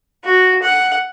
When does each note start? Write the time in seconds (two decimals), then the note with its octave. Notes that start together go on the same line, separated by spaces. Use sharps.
0.25 F#4
0.62 F#5